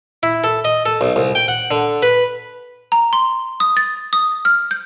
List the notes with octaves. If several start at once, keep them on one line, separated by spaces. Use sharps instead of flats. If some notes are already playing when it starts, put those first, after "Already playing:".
E4
A4
D#5
A4
B1
C2
G5
F#5
D3
B4
A#5
C6
D#6
A6
D#6
F6
G6